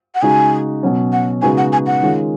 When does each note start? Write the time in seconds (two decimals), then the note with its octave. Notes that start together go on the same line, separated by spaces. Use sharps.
0.15 F#5
0.22 C#3 G#3 D#4 F#4 G#5
0.83 B2 F#3 C#4
1.13 F#5
1.42 C#3 G#3 B3 D#4 F#4 G#5
1.58 F#5
1.73 G#5
1.87 F#5
2.02 D#3 G#3 C#4 F4